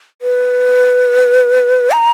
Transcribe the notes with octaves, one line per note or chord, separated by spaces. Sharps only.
B4
A#5